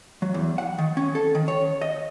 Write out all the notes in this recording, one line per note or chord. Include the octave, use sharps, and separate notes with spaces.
F#3
E2
F#5
D#3
C#4
A4
D#3
C#5
D#5